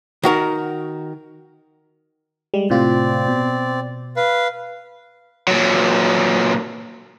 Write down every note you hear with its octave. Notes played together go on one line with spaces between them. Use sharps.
D#3 F#4 A#4
G3 G#3
A2 C3 C4 F4 D5
B2
B4 F5
A#2 F#3